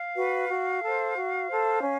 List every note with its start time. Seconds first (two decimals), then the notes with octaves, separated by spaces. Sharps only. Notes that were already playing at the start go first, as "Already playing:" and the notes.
Already playing: F5
0.15 F#4 B4
0.49 F#4
0.82 A4 C5
1.15 F#4
1.49 A4 C5
1.82 C#4